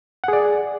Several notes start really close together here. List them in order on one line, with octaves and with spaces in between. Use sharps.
F#5 G#4 D5